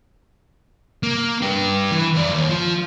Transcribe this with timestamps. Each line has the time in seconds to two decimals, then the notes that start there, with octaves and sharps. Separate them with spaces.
1.03 A#3
1.41 G2 G4
1.92 E3
2.15 F2 D5
2.32 D#2
2.50 F3